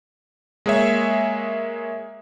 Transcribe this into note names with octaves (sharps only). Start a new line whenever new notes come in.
G#3 A#3 G#4 C#5 E5